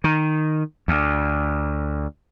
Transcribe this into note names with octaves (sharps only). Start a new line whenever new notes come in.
D#3
D2